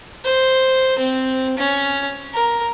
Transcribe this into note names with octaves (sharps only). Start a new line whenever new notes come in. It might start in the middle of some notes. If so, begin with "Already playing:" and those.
C5
C4
C#4
A#4